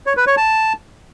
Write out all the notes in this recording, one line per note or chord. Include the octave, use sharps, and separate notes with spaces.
C#5
B4
C#5
A5